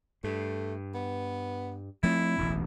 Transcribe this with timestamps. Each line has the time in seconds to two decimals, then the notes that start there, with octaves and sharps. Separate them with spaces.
0.24 G2 A3
0.94 B3
2.03 F3 A3 C4 E4
2.38 E1 A1 D2